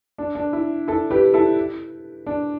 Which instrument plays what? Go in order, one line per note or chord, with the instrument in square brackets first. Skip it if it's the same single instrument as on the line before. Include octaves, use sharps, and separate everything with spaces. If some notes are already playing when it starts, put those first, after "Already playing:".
[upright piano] D4
D4
E4
E4 A4
G4 B4
E4 A4
D4